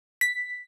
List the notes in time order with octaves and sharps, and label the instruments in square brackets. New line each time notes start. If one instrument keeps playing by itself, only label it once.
[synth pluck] B6